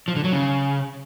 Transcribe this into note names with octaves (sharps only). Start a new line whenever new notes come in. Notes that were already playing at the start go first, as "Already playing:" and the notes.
F3
D3
F#3
C#3